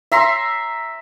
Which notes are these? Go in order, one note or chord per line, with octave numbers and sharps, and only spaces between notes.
E5 A#5 C6